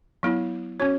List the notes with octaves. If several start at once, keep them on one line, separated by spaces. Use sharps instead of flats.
F#3 B3 E4
C#4 F#4 C#5